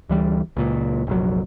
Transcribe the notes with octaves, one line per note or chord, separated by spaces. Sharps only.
D2 E3 G3
C#2 A#2
F1 A#1 F#3